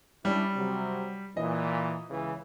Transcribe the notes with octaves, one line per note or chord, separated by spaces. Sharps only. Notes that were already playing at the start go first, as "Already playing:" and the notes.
G3 C#4 D4 E4
C3 F#3
A#2 E3 D#5
C#2 C#3 E3